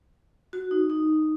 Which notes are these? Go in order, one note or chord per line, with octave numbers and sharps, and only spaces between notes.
F#4
D#4
D#4